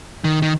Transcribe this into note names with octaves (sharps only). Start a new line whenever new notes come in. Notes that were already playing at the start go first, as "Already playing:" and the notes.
D#3
D#3